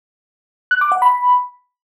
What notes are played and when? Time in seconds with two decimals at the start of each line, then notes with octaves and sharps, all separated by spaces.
0.71 F#6
0.81 D6
0.92 F#5
1.02 B5